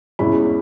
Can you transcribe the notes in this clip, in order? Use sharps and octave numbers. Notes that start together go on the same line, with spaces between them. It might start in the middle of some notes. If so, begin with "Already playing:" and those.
E2 B2 G#3 C#4 E4 B5